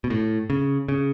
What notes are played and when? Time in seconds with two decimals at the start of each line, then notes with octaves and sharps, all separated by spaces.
0.04 B2
0.10 A2
0.50 C#3
0.88 C#3